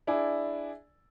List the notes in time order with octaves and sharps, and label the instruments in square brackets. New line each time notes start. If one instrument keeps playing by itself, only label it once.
[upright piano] D4 E4 G#4 D5 G#5